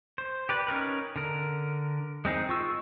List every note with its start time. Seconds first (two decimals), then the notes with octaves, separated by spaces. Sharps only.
0.18 C5
0.49 G4 B4 D5
0.67 C#4 D#4 A#4 B4
1.16 D3 A#4
2.25 G#3 C4 D#4 G#4
2.49 F4 C#6 E6